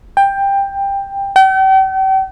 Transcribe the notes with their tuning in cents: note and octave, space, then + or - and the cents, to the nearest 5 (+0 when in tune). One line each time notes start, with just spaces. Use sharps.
G5 +15
G5 -40